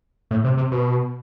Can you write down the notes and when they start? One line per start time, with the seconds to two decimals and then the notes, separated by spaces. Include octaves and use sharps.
0.31 A2
0.44 C3
0.57 C3
0.72 B2